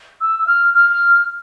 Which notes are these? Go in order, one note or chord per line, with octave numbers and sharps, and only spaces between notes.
E6
E6
F6
F6